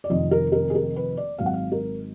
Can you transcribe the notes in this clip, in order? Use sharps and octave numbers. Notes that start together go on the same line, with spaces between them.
D5
F1 F2 D#3 D#5
A#4
A#4
G#4
A#4
B4
D5
G#1 G#2 F#3 F5
F#5
F5
A#4